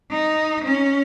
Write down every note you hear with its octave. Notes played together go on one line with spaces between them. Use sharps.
D#4
C#4